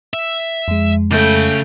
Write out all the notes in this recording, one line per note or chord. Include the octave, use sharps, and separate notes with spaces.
E5
F2 G#3
C#3 A3 G5